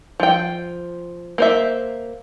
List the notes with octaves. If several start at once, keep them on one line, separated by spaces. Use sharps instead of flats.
F3 G5
A#3 C5 E5